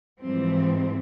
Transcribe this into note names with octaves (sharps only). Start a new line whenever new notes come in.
G#2 E3 F3 G3 C4